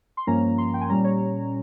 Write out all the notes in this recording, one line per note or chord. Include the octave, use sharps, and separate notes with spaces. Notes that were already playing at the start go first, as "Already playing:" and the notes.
C6
G2 F3 A#3 C#4 A#5
C6
G5
G#5
A#2 G3 C#4 A#5
C#5